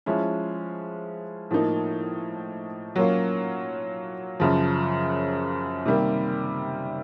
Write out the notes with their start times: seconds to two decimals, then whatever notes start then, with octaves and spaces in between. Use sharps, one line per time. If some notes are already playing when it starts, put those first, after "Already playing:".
0.06 F3 G#3 C#4 E4
1.51 A2 F3 A#3 D#4
2.96 F#3 A#3 C#4 F4
4.40 F#2 C#3 F3
5.86 C3 D#3 G3 A#3